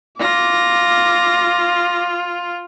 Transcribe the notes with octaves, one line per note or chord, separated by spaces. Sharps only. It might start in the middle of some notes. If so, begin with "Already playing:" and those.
F4 D6 A#6